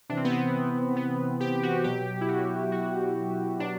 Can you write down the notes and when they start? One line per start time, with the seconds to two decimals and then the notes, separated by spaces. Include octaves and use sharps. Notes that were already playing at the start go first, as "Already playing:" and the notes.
0.09 C3 E3 D4
0.17 C4
0.25 B3
0.32 C4
0.96 B3
1.40 G4
1.63 F#4
1.84 B2 F#3 G4
2.21 E4
2.28 F#4
2.72 F#4
3.60 B2 F#3 D4